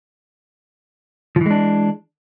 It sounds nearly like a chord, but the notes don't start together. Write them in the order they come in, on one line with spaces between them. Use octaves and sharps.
F3 E3 G#3 D4